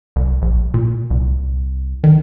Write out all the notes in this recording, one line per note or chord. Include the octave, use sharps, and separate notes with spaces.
C2
A#1
A#2
C2
D#3